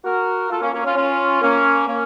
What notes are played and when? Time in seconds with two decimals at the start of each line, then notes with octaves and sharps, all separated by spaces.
0.05 F#4 A#4
0.50 F4 A4
0.61 A#3 C#4
0.73 A#3 C#4
0.85 C#4 F4
0.96 C#4 F4
1.42 A#3 C#4
1.87 A#3 C#4